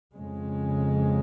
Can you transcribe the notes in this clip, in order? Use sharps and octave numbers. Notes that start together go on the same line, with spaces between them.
F2 C#3 G#3